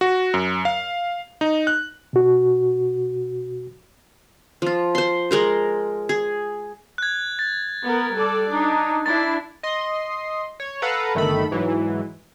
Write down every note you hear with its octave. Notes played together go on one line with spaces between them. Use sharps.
F#4
F#2
F5
D#4
F#6
B2 F#4
F3 F4
C5 C6
G#3 A#4 C5
G#4
F#6 G#6
A6
B3 A#4
G3 A4 D5
D4 D#4
D4 E4 A6
D#5 C6
C#5
A4 B4 F5 F#5 A#5
G1 D#3 A3 A4 B5
G#2 E3 F#3